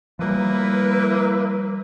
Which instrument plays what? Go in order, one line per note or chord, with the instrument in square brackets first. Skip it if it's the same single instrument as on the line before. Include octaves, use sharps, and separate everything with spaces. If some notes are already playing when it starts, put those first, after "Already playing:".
[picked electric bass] F3 G3 [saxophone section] A#3 E4 B4